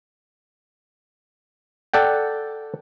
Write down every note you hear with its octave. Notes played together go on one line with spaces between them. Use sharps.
A4 D5 F#5 G5